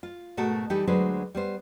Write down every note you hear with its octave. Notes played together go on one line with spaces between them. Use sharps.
F4
G#2 B2 A3 F#4 A4 A#4
E3 G3 D#4 G4 A4
D2 F#3 G#3 D4 B4 C5
G3 B3 C5